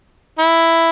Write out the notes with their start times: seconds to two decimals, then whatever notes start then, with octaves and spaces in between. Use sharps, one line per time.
0.39 E4